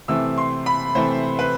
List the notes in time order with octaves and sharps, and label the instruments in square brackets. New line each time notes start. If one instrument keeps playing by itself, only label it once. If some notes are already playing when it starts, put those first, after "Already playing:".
[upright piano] C3 E3 A3 C4 E6
C6
B5
C3 E3 A3 C4 C5
B4